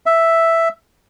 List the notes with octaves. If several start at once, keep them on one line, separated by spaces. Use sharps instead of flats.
E5